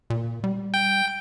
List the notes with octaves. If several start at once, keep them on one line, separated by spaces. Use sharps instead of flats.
A#2
G3
G5